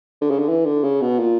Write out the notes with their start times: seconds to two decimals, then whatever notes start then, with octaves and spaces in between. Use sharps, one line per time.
0.22 D3
0.30 C#3
0.39 D3
0.48 E3
0.66 D3
0.84 C#3
1.01 B2
1.19 A#2